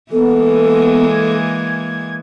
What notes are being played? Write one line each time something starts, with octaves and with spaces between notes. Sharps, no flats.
E3 G#3 A#3 B3 A4
G#6